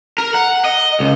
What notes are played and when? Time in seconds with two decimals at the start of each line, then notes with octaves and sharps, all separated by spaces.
0.18 A#4
0.35 F#5
0.64 D#5
1.00 C#2